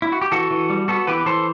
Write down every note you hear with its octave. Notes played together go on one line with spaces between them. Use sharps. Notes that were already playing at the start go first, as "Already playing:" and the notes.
E4
F#4
G4
E3 F#4 A4
E3
G3
B3 F#4 A4
E3 G4 B4
E3 A4 C5